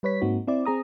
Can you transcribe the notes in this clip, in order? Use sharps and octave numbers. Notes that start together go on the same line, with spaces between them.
G3 B4 C#5 B6
G#2 A#3 C4 D#4 F#4
C4 E4 D5
C4 G#4 A#5 D#6